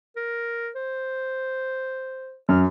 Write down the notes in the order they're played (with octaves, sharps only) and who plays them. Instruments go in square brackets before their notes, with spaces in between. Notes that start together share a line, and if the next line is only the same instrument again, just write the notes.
[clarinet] A#4
C5
[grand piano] F#2 [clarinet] F6